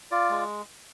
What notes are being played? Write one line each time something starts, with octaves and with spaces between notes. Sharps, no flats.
F4 D5
G#3